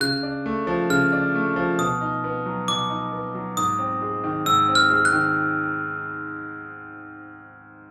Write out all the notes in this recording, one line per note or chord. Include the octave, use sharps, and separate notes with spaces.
C#3 F#6
D4
A3
F3
C#3 F6
D4
A3
F3
B2 D#6
D#4
B3
F#3
B2 D6
D#4
B3
F#3
G#2 D#6
C4
G#3
D#3
G#2 E6
C4
F6
G#3
F#6
D#3